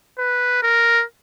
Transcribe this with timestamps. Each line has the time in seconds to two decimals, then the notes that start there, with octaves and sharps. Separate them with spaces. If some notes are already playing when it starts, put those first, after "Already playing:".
0.18 B4
0.63 A#4